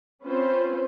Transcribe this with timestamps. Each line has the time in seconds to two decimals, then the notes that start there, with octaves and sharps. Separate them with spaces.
0.25 C4 C#4 F4 B4 C5